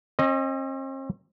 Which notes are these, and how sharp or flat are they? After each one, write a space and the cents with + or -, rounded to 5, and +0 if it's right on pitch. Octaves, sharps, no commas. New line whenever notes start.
C4 +45 D#5 +0